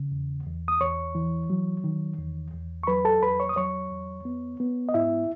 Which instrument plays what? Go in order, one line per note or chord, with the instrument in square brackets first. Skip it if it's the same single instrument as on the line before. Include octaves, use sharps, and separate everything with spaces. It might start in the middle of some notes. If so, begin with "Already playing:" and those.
Already playing: [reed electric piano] C#3
E2
E2
D#6
E2 C#5 C#6
E3
F#3
D#3
E2
E2
C#6
F#3 B4 B5
A4 A5
E2 B4 B5
C#5 C#6
D#6
F#3 C#5 C#6
E2
B3
B3
D#5
G#2 E4 E5